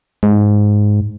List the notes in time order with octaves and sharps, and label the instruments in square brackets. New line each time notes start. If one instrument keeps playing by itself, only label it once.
[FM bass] G#2